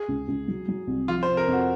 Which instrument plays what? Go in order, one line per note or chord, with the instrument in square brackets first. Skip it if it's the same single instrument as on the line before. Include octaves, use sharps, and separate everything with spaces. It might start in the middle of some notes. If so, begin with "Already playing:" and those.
Already playing: [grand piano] G#4
[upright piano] C#2
C#2
F#3
F#3
C2
[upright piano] F3 [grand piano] F4
[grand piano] C5
[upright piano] C3
[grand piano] A#4
[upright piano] F2 [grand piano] F#4